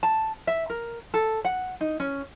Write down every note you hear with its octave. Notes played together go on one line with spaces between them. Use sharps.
A5
E5
A#4
A4
F#5
D#4
C#4